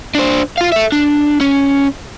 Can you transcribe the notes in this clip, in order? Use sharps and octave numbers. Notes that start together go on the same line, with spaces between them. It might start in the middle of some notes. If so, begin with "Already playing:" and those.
D4 C5
F4 F5
A4 E5
D4
C#4